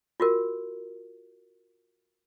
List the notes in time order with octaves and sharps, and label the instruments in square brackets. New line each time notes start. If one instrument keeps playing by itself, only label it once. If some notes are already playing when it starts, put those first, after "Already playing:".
[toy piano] F4 F#4 A#4